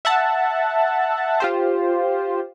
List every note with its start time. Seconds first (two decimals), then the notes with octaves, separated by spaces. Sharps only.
0.05 E5 F#5 A5
1.40 F4 G4 C5